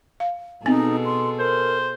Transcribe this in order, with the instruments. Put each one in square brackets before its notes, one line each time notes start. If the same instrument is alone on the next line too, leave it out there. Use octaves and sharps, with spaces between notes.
[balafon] F5
[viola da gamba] B2 G#4 A4 [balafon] B3 C4 [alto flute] D#4
[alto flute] C6
[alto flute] A#4 [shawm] C5